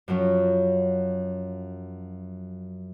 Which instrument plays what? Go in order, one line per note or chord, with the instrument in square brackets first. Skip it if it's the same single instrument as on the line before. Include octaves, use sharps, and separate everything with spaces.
[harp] F#2 F3 F#3 C#4